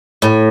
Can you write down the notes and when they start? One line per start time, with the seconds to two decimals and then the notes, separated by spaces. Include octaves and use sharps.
0.22 A2